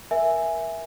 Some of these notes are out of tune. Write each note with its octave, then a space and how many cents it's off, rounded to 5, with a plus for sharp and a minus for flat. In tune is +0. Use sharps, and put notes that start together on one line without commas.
A#4 +25 E5 +0 G#5 +0